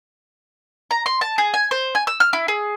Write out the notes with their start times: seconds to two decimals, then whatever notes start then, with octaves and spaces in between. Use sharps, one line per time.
0.91 A#5
1.06 C6
1.21 A5
1.38 G#4
1.54 G#5
1.71 C5
1.95 G#5
2.07 E6
2.20 F6
2.33 E4
2.48 G#4